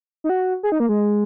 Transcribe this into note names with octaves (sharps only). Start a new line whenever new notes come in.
D#4
F#4
G#4
D#4
A#3
G#3